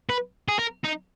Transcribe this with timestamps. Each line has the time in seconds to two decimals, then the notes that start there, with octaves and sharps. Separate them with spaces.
0.09 B4
0.48 G#4
0.59 A#4
0.84 D#4